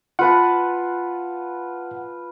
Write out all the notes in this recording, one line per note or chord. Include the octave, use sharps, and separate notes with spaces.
F4 B4 F#5 A5